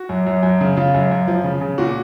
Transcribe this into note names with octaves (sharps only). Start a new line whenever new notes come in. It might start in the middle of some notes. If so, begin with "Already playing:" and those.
Already playing: F#4
F#2
F#2
F#2
C#3
C#3 F4
F#2
F#2
F3
C#3
C#3
A#2 F#4